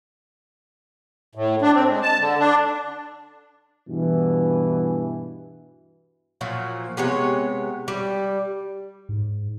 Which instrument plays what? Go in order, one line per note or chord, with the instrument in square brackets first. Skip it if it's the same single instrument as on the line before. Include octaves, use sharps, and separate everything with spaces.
[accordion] A2
D4
C4
G#3
A5
D3
D4
[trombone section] G2 B2 E3
[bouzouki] A#2 F3 F#3
C3 G#3 B3 C#5
G3
[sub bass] G#2